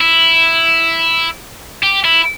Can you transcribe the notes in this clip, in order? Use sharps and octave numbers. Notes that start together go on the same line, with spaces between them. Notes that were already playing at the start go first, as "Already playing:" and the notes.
E4
G4
E4